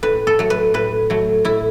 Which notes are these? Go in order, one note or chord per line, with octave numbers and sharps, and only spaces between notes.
A2 B4
A4
F#3 A3
B4
A2 B4
F#3 A3
A2 E4